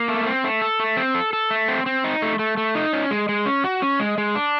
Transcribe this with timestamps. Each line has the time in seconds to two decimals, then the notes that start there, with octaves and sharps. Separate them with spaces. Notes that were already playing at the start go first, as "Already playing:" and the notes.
Already playing: A#3
0.08 A3
0.26 C4
0.44 A3
0.62 A4
0.80 A3
0.97 C4
1.15 A4
1.33 A4
1.51 A3
1.68 C4
1.86 C4
2.04 D#4
2.22 A3
2.39 A3
2.57 A3
2.75 D#4
2.93 C#4
3.11 G#3
3.29 G#3
3.46 C#4
3.64 F#4
3.82 C#4
4.00 G#3
4.18 G#3
4.35 D4